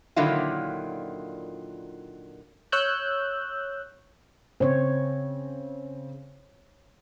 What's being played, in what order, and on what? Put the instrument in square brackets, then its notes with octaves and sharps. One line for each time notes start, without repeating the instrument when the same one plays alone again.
[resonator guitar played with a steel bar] A#2 D3 D#3 F#3 E4 F4
[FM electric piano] C#5 E6 F#6 G6
[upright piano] C#3 C4 [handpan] C5 C#5